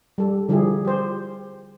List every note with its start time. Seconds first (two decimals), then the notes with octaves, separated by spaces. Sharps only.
0.18 G3 A4
0.49 D3 F3 G3 E4 G4 G#4
0.85 G4 C5